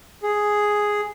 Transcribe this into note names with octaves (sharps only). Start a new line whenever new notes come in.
G#4